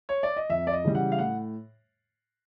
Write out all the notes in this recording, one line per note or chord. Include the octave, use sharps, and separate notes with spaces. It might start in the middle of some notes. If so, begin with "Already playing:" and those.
C#5
D5
D#5
F2 E5
D5
D#5
C#3 E3 G3
F#5
F5
A2 F#5